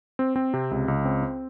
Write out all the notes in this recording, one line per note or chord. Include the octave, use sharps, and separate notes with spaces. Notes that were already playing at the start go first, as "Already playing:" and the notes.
C4
C4
C3
C#2
C#2
C4
C4